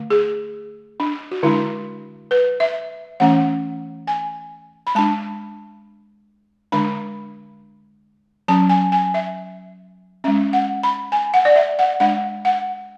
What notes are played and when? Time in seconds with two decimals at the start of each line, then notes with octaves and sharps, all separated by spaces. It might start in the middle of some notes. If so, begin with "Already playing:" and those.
Already playing: D3 A3
0.10 G#4
1.00 D4
1.31 F#4
1.43 D3 G#3 D4 E4
2.31 B4
2.60 E5
3.20 E3 A3 C#4 F#5
4.07 G#5
4.87 B5
4.95 G#3 D4 A5
6.72 D3 G#3 D4 B5
8.48 F#3 C#4 A5
8.69 G#5
8.92 G#5
9.14 E5
10.24 G#3 C#4 E5
10.53 F#5
10.83 B5
11.12 G#5
11.34 F#5
11.45 D5
11.56 E5
11.79 F#5
12.00 G#3 D4 F#5
12.45 F#5